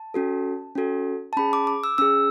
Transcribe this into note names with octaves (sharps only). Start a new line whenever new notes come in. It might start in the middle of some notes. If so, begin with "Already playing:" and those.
Already playing: A5
C#4 F#4 A4
C#4 F#4 A4
A5
C#4 G#4 B5
D6
D6
E6
C#4 G#4 E6